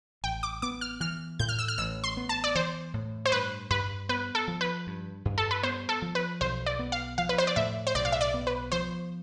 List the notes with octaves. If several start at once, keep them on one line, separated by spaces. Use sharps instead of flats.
A1 G5
D6
B3 D6
F6
E3 F6
A2 G6
F6
E6
F6
A1 E6
C6
B3
A5
D5
E3 C5
A2
C5
G2 B4
G2 B4
B3 B4
A4
F3
B4
G2
G2
A4
B4
B3 C5
A4
F3
B4
B1 C5
D5
B3
F5
F3 F5
B4
C5
D5
A2 E5
C5
B1 D5
F5
E5
D5
B3
B4
F3 C5